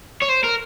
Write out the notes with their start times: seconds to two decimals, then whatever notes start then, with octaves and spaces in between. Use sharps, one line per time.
0.22 C#5
0.29 C5
0.44 A#4